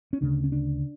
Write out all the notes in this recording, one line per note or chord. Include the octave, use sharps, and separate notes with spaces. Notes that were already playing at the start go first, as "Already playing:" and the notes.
C#4
D2 C#3 D4
C#4
D4